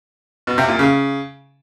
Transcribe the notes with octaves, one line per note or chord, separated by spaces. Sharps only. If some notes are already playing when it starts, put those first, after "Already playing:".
B2
C3
A#2
C#3